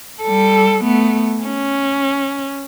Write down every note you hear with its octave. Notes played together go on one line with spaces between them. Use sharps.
G3 A4
A3 B3
C#4